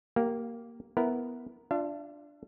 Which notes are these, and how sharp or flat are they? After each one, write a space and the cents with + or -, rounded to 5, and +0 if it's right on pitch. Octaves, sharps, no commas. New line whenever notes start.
A#3 +0 G4 -20
B3 +0 E4 +0 A#4 +0
D4 +0 F4 +0 E5 +45